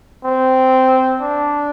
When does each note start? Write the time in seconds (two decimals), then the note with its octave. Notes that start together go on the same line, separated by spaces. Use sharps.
0.25 C4
1.22 D4